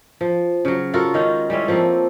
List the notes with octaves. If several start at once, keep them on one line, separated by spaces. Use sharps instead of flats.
F3
C#3 F#3
F4 F#4 A4 A#4
D#3 G#3 C#4 D#4
G3 G#3 C#4 E4
F3 A3 A#3 C4